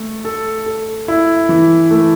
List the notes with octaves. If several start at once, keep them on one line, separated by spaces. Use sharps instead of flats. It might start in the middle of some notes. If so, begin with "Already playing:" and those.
Already playing: A3 A4
A4
A4
E4
E3
A3